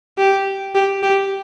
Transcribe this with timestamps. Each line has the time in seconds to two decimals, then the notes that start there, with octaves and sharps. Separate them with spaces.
0.18 G4
0.75 G4
1.03 G4